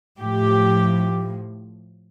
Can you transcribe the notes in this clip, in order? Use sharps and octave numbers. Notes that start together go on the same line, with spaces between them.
A2 F3 G4